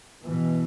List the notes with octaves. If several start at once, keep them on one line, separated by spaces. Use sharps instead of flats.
B2 E3